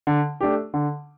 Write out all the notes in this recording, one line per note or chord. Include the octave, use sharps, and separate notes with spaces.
D3
A3 D4 G4
D3